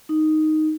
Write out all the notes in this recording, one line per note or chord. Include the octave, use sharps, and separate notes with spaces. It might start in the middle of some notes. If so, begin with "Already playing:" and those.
D#4